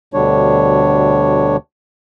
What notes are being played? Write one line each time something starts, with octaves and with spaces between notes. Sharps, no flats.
D2 B2 D3 G3 D4 C#5